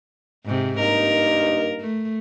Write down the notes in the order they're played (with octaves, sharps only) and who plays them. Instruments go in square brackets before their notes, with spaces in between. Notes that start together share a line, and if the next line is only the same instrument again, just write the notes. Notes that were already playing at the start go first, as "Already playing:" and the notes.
[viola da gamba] G#2 C3
[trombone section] G2 A#3 D#4 [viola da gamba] A#4
[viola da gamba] A3